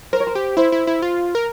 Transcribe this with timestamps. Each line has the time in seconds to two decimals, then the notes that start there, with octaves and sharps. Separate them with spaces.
0.13 A#4 C5
0.20 C#5
0.27 C5
0.35 G4
0.57 E4 C5
0.72 E4
0.87 E4
1.02 F4
1.35 A#4